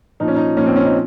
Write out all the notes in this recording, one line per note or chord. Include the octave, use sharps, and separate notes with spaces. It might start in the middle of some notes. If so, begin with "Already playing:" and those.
A#2 F3 D#4
C#4
D#4
A#2 F3 C#4
C4
C#4
D#4